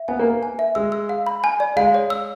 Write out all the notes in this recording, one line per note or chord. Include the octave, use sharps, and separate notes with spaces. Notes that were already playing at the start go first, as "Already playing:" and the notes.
Already playing: E5
B3 G#5
A#3
B4
G#5
E5
G#3 E6
E6
F5
B5
G#5
D5
G#3 F5
C#5
E6